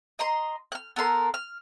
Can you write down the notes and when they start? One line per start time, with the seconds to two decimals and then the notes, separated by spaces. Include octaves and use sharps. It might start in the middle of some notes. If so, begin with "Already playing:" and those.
0.19 D#5 A#5 C6
0.72 F6 F#6
0.96 B3 A4 A#4 C6
1.34 F6